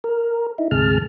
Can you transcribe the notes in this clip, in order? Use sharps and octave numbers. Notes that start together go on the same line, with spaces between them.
A#4
D#4 E4
D2 G#2 C3 G#4 A5 F6